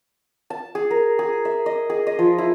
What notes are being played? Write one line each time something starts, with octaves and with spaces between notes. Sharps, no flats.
A5
G#4
A#4
G#4
E5
D#5
G#4
D#5
F3
E4